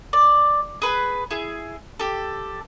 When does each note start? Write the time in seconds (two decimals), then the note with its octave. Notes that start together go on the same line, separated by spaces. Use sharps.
0.13 D5
0.82 G#4 B4 B5
1.31 E4 G#4
1.99 G4 A4